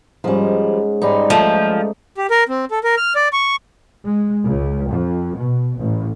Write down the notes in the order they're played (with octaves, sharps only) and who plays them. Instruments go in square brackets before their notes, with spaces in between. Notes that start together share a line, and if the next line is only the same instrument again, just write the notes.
[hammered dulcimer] G#2 C#4 [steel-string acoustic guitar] F3 G3
[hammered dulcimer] G#2 G3 G#3 [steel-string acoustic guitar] D#4
[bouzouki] F3 [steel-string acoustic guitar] A3
[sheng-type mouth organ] G4
A#4
C4
A4
A#4
F6
D5
C#6
[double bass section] G#3
C#2
F2
B2
A1